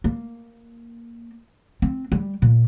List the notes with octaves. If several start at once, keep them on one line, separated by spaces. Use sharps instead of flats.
A#3
C4
G3
A#2